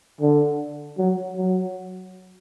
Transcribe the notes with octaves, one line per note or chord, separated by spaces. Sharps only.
D3
F#3
F#3